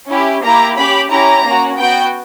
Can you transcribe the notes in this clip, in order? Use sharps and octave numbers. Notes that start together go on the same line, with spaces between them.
C#4 E4 G4
A#3 E4 G4 A#5
C#4 G4 B5
C#4 E4 G4 A#5
A#3 C#4 F#4
B3 F#4 G5